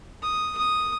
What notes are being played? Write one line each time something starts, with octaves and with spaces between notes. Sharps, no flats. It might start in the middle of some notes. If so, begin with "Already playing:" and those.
D#6
D#6